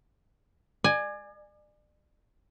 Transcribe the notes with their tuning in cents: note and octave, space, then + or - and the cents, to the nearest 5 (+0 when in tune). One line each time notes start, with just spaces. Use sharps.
D5 +35 G#5 +0